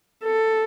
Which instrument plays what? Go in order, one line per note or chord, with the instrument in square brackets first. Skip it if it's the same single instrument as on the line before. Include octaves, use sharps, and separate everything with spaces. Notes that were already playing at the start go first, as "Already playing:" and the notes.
[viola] A4